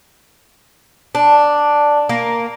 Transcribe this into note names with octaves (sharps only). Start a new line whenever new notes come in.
D4
A#3